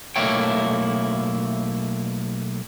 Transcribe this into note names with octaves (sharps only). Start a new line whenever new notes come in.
B1 A3 A#3 E4 C#5 G5